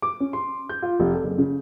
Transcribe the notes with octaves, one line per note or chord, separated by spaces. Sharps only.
D6
C#4
C6
G6
F4
F1
A4
F#1
C#3